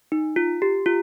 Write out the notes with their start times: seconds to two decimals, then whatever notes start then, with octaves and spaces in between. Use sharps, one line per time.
0.12 D#4
0.36 F4
0.62 G4
0.86 F4